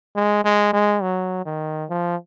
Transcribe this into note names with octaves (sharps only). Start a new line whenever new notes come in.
G#3
G#3
G#3
F#3
D#3
F3